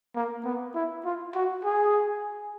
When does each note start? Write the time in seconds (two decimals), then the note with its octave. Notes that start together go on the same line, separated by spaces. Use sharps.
0.16 A#3
0.45 B3
0.75 E4
1.05 F4
1.35 F#4
1.64 G#4